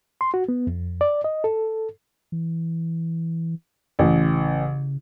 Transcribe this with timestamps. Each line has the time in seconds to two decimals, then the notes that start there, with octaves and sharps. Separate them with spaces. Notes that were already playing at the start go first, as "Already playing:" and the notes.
0.21 C6
0.34 F#4
0.49 B3
0.67 F2
1.01 D5
1.24 D#5
1.44 A4
2.32 E3
3.99 A1 C#3